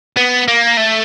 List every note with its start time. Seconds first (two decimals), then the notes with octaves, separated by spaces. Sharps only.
0.17 B3
0.48 A#3
0.77 A3